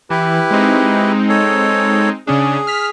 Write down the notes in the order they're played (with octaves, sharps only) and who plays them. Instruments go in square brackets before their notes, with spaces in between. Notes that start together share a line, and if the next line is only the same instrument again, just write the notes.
[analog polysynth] E3 [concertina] E4 G4 B4
[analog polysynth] G#3 C4 D#4
[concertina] A4 C#5
[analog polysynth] C#3 C#4 D4 [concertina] G#4
[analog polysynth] F6 B6